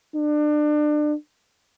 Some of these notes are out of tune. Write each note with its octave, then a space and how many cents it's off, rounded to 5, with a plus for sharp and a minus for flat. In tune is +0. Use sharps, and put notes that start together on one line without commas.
D4 +30